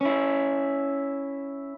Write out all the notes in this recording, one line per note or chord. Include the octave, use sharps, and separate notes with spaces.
C#4 E4